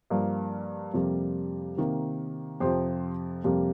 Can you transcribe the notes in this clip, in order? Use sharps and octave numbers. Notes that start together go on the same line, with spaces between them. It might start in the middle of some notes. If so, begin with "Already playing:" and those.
G2 F3 A#3
F2 C3 G3 A#3
C3 D#3 A#3
F2 C3 F3 G4 C5
F2 C3 G3 A#3